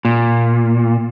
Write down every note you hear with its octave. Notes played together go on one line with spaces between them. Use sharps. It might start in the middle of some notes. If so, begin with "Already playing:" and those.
A#2